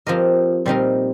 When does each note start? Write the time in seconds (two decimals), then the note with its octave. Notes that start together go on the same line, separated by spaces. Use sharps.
0.07 F3 C4 G4 A#4 D#5
0.66 A#2 G3 C4 D#4 A#4